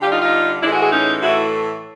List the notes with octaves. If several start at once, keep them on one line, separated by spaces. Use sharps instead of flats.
D3 G3 F4 G4
D#4 F4
D#4 F4
A2 E3 G#3 D4 E4
F#4 G#4
F#4 G#4
C#4 D#4
A2 E3 A3 E4 F#4